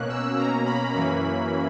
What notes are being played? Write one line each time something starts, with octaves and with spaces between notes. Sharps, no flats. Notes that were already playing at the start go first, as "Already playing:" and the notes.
Already playing: B2 A#3 C#4 F#6
E6
B2 A#3 C#4 A#5
B5
F#2 E3 A#3 C#4 B5